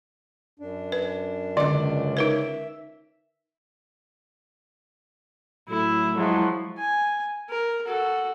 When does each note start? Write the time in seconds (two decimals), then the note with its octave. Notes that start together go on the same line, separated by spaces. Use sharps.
0.59 F#2 D4
0.92 B4
1.57 C#2 D3 D5 D#5
2.17 D#4 A#4 B4 E5
5.69 A2 F#3 A3 E4
6.17 F3 F#3 G#3 E4
6.78 G#5
7.50 A#4
7.87 F#4 A4